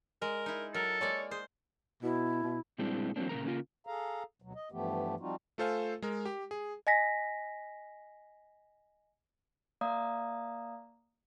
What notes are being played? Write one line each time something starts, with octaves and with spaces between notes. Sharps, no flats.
G#3 A#4
D#4 E4
F#3 A4 A#4
G#3 A#3 C#5 D5
G#4 C5
B2 E4
B2
A#2 G3 G#3 C4 D4 E4
E3 F#3 G#3 A#3 C4 D4
A#2 C#3 E3 A#4 A#5
C#3 A#3 C4 F4 A#4
G#4 A4 F5 A#5
D2 B2 F#3
D#5
G2 E3 F3 A3 B3 G4
F3 G3 C4 D#4 F4 F#4
A3 F4 A4 C5 F5 G#5
G#3 A#4
G4
G#4
D#5 G#5 A#6 B6
A#3 D5 F5 A#5 D#6